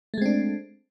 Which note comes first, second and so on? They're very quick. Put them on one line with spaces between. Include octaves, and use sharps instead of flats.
A3 G#3 C4 D4